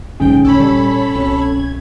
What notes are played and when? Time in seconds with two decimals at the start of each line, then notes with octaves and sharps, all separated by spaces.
0.20 A#1 G#2 D3 F#3 C#4 G5
0.45 A1 D2 C#3 A4 C#5 B5
0.59 A#2 G3
1.15 C2 B2 C4
1.42 G#6